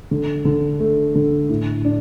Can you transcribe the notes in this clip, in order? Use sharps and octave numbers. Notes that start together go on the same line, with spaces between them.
D3
D3
A3
D3
A2
D4